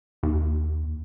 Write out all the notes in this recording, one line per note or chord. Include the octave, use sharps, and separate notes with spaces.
D#2